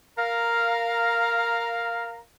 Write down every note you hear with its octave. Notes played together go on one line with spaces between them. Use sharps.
A#4 F5 A#5